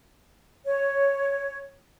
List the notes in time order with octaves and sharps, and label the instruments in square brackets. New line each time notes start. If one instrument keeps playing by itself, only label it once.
[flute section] C#5